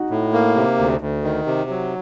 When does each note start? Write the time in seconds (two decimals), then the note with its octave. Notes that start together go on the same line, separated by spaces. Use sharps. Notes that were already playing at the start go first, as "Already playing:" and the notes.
Already playing: D#4 F#4
0.10 A2
0.33 A#3
0.55 C3
0.78 D2
1.01 D2
1.24 D#3
1.46 C3
1.70 F#3